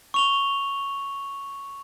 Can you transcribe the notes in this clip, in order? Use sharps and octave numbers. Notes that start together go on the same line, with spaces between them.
C#6 F7 G7